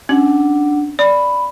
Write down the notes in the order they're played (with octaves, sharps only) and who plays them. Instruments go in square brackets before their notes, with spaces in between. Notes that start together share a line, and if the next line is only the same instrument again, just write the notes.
[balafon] C#4 [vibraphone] D4 F#5
[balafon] D5 [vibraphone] B5